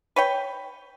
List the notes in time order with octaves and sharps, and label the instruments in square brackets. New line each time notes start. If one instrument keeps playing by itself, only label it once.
[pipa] B4 C#5 G5